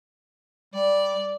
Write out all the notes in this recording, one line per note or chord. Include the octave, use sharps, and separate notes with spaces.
G3 D5